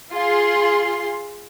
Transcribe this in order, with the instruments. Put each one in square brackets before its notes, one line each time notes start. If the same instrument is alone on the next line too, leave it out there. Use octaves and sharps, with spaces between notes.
[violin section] F4 G#4 C6